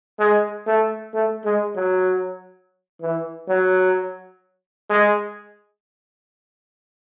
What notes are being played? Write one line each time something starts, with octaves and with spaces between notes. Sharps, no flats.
G#3
A3
A3
G#3
F#3
E3
F#3
G#3